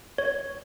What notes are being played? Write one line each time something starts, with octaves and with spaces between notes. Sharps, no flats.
C#5